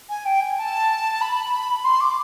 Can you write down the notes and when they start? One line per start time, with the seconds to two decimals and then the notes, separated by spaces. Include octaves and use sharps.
0.09 G#5
0.25 G5
0.40 G#5
0.57 A5
1.21 B5
1.84 C6
2.00 D6